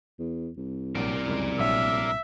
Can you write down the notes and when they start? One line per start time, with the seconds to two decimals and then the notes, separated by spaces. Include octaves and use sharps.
0.19 E2
0.57 C2
0.95 A#1 F#3 A#4 D5
1.27 C#2 F#2 G#3
1.59 A#1 F#3 E5